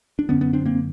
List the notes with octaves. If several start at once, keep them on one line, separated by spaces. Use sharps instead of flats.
D4
F#2 D3 B3 C#4
B3 C#4
C4 D4
A#3 C4